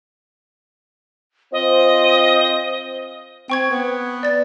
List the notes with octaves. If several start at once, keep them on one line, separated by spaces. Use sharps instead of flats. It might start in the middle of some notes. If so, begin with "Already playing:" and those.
C4 F4 C5 D#5
C4 G5 C#6 G#6
B3
D5 A6